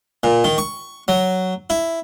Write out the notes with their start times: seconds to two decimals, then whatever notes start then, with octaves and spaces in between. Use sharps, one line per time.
0.23 A#2
0.44 D#3
0.58 C#6
1.08 F#3
1.70 E4